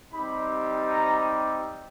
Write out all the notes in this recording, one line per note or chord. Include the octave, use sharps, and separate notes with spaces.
G3 C4 D#4 G4 B5
A#5